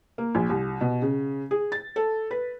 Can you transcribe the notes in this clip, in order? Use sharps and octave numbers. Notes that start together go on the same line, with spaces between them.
A#3
A#1
C2
B2
C#3
G#4
A6
A4
B4